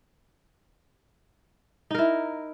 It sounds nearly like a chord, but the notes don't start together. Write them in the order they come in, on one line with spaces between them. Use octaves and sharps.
D#4 A#4 E4